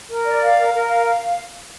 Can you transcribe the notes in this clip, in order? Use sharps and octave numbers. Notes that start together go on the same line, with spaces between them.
A#4
D5
F5
A#4
A#4
F5
F5